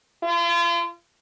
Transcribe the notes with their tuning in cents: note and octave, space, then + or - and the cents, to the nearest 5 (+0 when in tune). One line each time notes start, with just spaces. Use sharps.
F4 -40